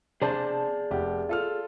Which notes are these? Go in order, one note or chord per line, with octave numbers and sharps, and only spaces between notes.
C3 D4 G#4 C5 D5 A5
F1 G4 F#5
F4 A4 F6